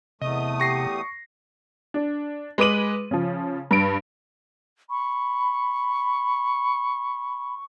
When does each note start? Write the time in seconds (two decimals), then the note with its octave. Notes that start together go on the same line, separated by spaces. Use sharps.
0.22 E2 C3 A3 D#5 D#6
0.60 G4 C#6 A#6 C7
1.94 D4
2.58 G#3 B4 D6 D#7 F#7
3.11 C#3 F3
3.71 G2 D7
4.90 B5 C#6